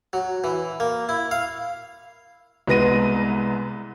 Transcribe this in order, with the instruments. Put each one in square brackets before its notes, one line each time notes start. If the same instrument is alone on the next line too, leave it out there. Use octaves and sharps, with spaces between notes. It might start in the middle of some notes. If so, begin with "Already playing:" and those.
[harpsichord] F#3
E3
A#3
E4
F5
[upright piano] C2 G#3 B3 A#6 D#7